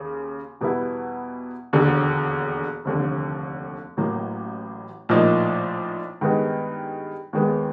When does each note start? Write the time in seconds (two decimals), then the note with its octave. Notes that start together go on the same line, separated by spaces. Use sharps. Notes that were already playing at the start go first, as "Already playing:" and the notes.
Already playing: D#2 C#3
0.61 E2 B2 G3 B3 E4
1.73 E1 D#2 D3
2.85 F1 D#2 D3
3.97 A1 A2 F#3 A#3
5.09 A#1 A2 F3 A#3 D#4
6.21 G2 D#3 G#3 B3 D#4
7.33 D#2 D#3 G#3 B3